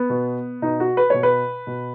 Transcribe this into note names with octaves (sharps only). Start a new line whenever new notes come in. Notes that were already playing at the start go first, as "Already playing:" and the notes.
Already playing: B3
B2
B2 D#4
F#4
B4
B2 C#5
B4
B2